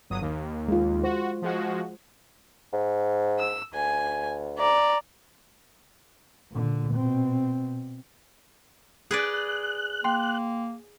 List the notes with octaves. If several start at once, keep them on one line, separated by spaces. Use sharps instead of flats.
G1 F#3 D#6
D#2
G#3 F4
F#4 C5
F3 G#3 F#4
G#2
E6
D2 G#5
D5 A#5
A#2 D3
B2 C4
G#4 B4 D5 F#6
A#3 G5 C6